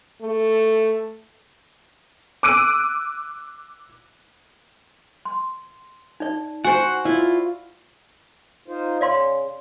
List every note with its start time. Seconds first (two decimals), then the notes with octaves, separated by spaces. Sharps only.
0.21 A3
2.43 D6 E6 F#6 D7 D#7
5.25 C6
6.20 D#4 D5
6.65 F#4 C5 F#5 G#5
7.05 E4 F4 D5
8.68 D#4 F4 C5
9.01 C#3 D5 F5 C6